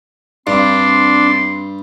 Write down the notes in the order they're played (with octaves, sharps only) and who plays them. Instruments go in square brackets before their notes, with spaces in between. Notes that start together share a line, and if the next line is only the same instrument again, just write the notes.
[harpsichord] G2 [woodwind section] C4 [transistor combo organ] D4 [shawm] C6